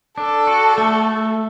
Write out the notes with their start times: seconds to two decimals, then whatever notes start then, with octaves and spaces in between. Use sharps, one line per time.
0.18 D4 A4
0.47 F#4
0.78 A3